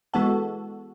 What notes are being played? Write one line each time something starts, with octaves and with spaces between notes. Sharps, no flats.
E3 G#3 B3 F#4 A4